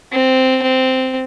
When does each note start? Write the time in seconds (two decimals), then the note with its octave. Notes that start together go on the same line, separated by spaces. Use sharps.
0.12 C4
0.62 C4